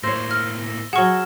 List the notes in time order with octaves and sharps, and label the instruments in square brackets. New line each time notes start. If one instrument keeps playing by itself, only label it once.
[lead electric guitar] A2 A#3 [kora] C5 C#5 [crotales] E6 A#6 G7
[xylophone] F6
[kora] F#3 G#4 [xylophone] F#5 C#6 [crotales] F6 G#6 E7